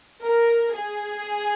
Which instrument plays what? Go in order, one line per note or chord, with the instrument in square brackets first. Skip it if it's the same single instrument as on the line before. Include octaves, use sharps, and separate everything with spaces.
[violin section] A#4
G#4